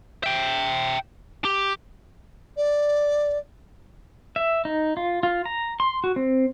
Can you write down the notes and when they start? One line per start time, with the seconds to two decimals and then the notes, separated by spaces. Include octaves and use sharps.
0.24 E5 G5
1.45 G4
2.57 D5
4.36 E5
4.65 D#4
4.97 F4
5.23 F4
5.46 A#5
5.80 C6
6.04 F#4
6.16 C4